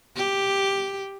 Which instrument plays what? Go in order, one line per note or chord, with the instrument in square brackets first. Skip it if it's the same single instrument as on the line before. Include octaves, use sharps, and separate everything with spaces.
[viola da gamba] G4